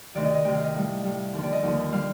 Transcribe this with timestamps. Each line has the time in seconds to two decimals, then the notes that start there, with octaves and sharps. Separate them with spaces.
0.15 D2 C3 D#3 D5
0.24 D#5
0.35 D#5
0.45 D2 C3 D#3 G5
0.54 F5
0.64 D#5
0.74 A2 G3
1.04 A2 G3
1.33 D#2 D3 F3
1.43 D5
1.52 D#5
1.62 D#2 D3 F3
1.92 D3 G3 F5